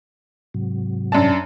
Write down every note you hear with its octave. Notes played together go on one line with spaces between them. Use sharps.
G#2 C3 F#3
F#2 D4 A5